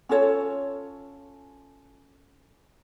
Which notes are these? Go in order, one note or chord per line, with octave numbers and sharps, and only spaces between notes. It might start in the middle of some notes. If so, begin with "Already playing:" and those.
C#4 F4 A4 C#5